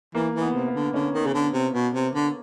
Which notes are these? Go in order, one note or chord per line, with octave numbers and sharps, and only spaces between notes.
E3 A#3
E3
B3
C3
B3
D3
D3 C#4
D#3
C#3
D3
C3
B2
C3
D3